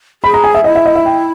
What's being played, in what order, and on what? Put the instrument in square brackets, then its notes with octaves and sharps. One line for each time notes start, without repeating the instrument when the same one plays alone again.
[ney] G#4 [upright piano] B5
[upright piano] A#5
G#5
E5
[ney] E4 [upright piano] D#5
[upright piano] E5
D#5
E5
G5